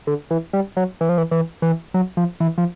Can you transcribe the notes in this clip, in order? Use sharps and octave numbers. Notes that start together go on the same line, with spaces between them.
D3
E3
G3
F#3
E3
F3
E3
E3
E3
F#3
F3
E3
F3